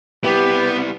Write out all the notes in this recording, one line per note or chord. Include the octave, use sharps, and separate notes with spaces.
G3 B3 E4 G4